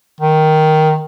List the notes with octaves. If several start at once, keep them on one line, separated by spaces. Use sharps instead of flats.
D#3